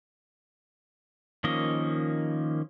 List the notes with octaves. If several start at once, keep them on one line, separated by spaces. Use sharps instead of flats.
D#3 F3 A#3 C#4 D#5